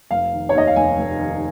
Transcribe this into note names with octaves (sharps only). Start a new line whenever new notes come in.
F1 F5
D#3
C#5
D#2 D#5
F5
F1 G#5
F1
D#3